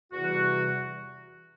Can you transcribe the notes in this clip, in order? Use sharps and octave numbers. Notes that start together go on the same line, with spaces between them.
E2 C3 E3 G3 F#4